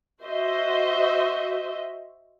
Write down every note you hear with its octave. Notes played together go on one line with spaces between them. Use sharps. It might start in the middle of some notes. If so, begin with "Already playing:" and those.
F#4 C5 D#5 E5